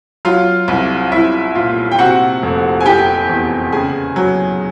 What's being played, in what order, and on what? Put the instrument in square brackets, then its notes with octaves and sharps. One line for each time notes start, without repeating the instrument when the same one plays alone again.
[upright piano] F#3 F4 F5
C2
C2 E4 E5
A#2 F4 F5
G5
C3 F#4 F#5
F1
G#5
F1 G4 G5
E2
C#3 G#4 G#5
F#3